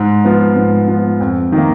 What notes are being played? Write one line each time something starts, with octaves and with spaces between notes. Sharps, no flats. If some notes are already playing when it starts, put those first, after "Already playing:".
Already playing: G#2
F3 B3
G#2
F3 B3
F2
D#3
A#3